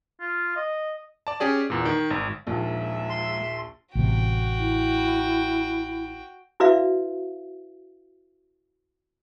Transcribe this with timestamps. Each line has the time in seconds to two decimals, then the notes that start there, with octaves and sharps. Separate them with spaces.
0.20 F4
0.57 D#5
1.27 D5 A5
1.40 C#4 G4 G#4 D5
1.70 E2 A#2
1.85 D#3
2.11 G#1
2.47 A#1 D#2 F3 G#3 A#3 E5
3.10 C6
3.95 A1 C3 F#4 G5
4.58 E4
6.60 E4 F#4 B4 D5 E5 F5